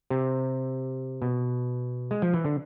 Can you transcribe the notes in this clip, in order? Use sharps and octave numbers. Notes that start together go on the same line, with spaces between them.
C3
B2
G#3
F3
E3
D3